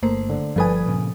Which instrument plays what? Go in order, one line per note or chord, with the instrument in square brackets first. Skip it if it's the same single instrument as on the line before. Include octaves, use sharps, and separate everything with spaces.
[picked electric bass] G1 [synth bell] A3 A#3 C5
[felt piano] D3
[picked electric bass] G1 [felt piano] G2 B4 G#5 [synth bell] F3 A4 D#6
[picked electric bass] A#2 C#3